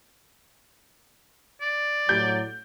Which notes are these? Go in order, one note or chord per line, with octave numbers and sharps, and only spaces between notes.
D5
A2 F#3 G6